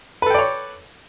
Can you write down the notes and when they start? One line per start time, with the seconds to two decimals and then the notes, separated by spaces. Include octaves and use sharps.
0.22 B4
0.26 A4
0.30 G5
0.34 D5
0.38 C#5